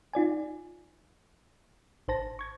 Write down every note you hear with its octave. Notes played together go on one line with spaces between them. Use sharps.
D#4 F4 D5 G#5
G#1 C5 A5 A#6
C#6 G#6